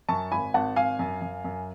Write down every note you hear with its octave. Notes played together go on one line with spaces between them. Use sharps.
F#2 A5 C#6
G#1 G#5 B5
G#1 F#5 A5
G#1 F5 G#5
F#2
F#2
F#2